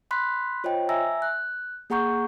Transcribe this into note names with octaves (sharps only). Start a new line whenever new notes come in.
B5 C6 F#6 B6
F4 C5 C#5 D#5 G5
E5 G#5 A#5 E6 A#6
F#6
A#3 G#4 F#5 A#5 C#6 G6